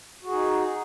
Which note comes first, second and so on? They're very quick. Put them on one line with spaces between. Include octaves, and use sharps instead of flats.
F#4 G#4 D#4